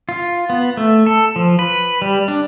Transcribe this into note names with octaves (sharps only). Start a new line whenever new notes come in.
F4
B3
A3
A4
F3
B4
G3
D4